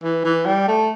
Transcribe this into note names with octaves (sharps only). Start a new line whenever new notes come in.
E3
E3
G3
A3